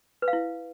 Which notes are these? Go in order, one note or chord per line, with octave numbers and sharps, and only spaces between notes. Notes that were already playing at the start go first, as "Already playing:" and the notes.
B4
F5
E4